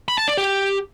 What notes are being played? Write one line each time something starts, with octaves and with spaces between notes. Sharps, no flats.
B5
A5
D5
G4